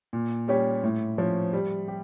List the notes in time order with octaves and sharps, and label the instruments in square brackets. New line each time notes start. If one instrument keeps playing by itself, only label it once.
[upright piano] A#2
G3 C#4 G4 C#5
A2
F3 C#4
G3
G4